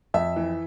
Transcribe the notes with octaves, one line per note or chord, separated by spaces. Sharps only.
F2 E5
E3